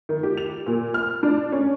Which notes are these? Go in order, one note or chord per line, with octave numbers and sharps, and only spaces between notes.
D#3
G4
F7
A#2
F6
D4
C#4